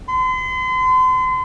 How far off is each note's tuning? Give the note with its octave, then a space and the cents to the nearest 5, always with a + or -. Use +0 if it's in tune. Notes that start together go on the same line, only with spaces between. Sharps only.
C6 -40